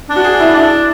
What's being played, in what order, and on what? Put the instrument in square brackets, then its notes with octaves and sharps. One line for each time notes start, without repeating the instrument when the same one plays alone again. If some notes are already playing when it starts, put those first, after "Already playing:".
[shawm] D4
[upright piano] F#4
G#4
E4
[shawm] D4 [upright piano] E4